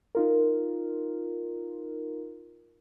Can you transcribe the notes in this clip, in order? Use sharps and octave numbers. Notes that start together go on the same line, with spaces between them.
D#4 F4 A#4